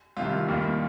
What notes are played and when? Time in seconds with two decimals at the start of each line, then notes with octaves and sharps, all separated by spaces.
0.17 C2 C3 D#3 F4
0.48 D#2 D#3 G3 A#3